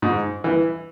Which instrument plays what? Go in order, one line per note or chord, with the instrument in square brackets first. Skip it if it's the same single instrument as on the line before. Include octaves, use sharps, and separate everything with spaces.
[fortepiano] G#2
E3